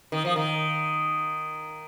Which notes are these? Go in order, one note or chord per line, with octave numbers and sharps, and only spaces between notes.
D#3
F3
D#3